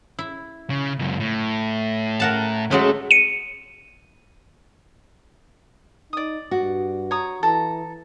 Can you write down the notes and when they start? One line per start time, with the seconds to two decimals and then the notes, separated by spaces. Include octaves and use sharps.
0.19 E4
0.70 C#3
0.99 C#2 F#2
1.20 A2
2.20 A#4 F#5 A5
2.71 F#3 G#3 A3 C#4
3.11 C#7 D#7
6.13 D#4 D5 D#6
6.51 G2 F#4
7.11 C#5 A#5 D#6
7.43 E3 A4 A#5